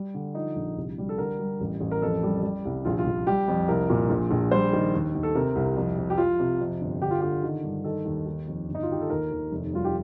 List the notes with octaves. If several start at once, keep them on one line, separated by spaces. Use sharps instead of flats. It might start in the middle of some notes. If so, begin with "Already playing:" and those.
Already playing: G3
D3
F3 D#4
A#1
C2
G3
A4
D3 A#4
G3
A1
A1
A#4
F2 A4
G3
G3
C2
A#1 F4
F4
A#1
G3 G4
F2
C2 A#4
A#2
A#1
A#1
G3 C5
D#3
D#2
D#2
A4
C3 A#4
C2
F2
F2
G4
F3 F4
C3
F2
G1
D3 G4
F4
D3 G4
D#3
G2
D#3 A4
D#2
D#3
F2
G1
D#4
F4
D#3 G4
A4
D#2 A#4
D#2
F1
G3 F4
G4